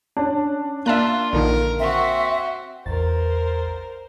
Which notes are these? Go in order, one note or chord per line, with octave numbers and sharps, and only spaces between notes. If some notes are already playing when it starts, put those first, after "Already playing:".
C#4 D4
A#3 D4 F4 E5 A5 F#6
A#1 D3 D#3 A#4
C4 F#4 E5
A1 E2 A#4 C5 A6